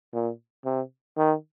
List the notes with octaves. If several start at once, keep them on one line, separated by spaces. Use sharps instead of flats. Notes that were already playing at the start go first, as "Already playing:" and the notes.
A#2
C3
D#3